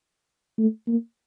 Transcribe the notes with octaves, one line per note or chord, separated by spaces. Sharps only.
A3
A#3